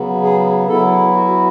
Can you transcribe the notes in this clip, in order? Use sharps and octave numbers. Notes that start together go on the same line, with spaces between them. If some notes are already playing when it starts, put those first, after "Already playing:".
Already playing: C#3 F#3 B3
G#4
F#3 B3 E4 A4
F#4